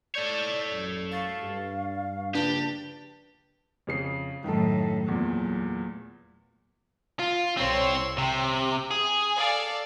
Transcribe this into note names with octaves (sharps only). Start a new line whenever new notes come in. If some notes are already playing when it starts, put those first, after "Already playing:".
A4 C#5 D5 G6
A1 F#2
F5 C#6 A6 C7
G2
A#1 C#3 D4 G4 B4 A5
F2 C#3 C7
F#2 A2 D#3 A4
E2 A#2 F#3 A3
F4
C2 C4 C#5 C6
C3 G5
G#4
A4 D5 F5